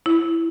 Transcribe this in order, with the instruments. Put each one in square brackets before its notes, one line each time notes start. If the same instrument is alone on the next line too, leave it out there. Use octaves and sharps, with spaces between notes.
[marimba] E4